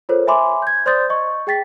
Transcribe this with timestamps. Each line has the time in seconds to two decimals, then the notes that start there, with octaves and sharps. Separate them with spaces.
0.09 F4 A4 A#4 C5 C#5
0.27 E5 G#5 B5 C6 D6
0.62 G6 G#6
0.86 C5 D5 C6 D#6 G6 A6
1.10 D#5 C#6
1.47 G#4 G5 A6 B6